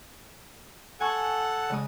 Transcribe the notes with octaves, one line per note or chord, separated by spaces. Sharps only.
A4 F#5 G#5 C#6
C#3 G#3 D#6